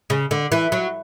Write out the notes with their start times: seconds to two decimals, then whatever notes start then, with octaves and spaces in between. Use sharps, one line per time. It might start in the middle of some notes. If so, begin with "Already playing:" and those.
0.10 C#3
0.31 D3
0.52 E3
0.72 F#3